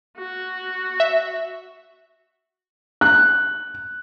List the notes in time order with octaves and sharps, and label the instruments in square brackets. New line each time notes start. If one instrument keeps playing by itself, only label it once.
[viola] F#4
[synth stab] E5
[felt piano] F#6